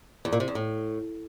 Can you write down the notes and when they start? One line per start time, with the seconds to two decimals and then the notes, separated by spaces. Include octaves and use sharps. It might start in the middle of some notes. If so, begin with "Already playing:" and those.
0.25 E2
0.33 A#2
0.40 C3
0.48 E2
0.55 A2